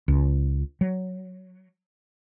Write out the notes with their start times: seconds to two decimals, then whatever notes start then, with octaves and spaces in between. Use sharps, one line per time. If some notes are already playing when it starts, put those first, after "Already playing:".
0.08 C#2
0.81 F#3